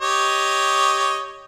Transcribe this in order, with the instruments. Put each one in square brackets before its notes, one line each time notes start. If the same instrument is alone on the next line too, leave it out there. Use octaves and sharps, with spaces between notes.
[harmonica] G4 C#5 D#5